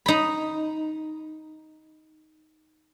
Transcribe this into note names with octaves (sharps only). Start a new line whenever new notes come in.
D#4 B5